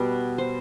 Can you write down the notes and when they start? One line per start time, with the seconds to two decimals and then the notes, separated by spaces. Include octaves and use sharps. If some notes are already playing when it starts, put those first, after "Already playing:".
Already playing: B2 G3 B3
0.38 C5